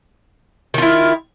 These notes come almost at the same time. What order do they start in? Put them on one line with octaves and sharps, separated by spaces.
D#3 F4 E4